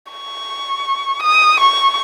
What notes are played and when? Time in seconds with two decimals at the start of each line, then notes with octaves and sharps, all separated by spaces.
0.12 C#6
1.23 D#6
1.60 C#6